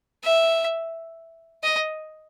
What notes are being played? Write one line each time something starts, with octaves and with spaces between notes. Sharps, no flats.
E5
D#5